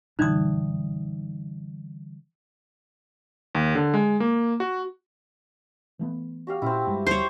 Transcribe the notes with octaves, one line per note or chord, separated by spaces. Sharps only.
G1 F#2 B2 D3 E3 G3 D#4 D#6
D#2
D3
G#3
A#3
F#4
E3 A3 B3
F#4 G4 F5
A#2 C4 C#4 E4
G2 G#3
D#2 G3 C5 C#5